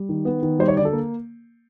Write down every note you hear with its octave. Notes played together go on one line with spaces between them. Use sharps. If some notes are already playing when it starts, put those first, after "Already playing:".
Already playing: G3
D#3
B3
D#3
G3 C5
C#5
D3 D5
A4
A#3